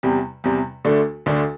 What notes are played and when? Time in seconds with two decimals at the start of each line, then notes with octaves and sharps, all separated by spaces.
0.03 E2 C3 G3
0.44 E2 C3 G3
0.85 D2 D3 A3 D4
1.26 D2 D3 A3 D4